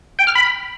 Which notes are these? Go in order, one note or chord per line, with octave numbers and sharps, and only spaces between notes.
G5
F6
B5